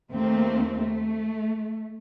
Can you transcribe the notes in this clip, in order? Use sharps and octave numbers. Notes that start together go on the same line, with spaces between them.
D#2 A3 A#3 C4
A3